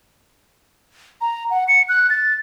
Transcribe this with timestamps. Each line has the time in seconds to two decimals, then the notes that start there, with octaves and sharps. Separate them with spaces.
1.21 A#5
1.51 F#5
1.68 C#7
1.89 F#6
2.10 A6